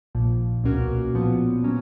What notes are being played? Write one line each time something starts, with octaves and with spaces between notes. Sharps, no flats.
A#1 A#2 F3
C#2 B2 A#3 C#4 F#4
A#2 F3 B3
A#2 F#3 C#4